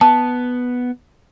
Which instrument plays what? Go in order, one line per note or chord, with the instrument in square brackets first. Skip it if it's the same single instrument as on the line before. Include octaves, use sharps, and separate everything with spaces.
[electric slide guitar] B3 [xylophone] A5